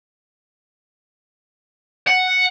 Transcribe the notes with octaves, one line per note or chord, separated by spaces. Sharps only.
F#5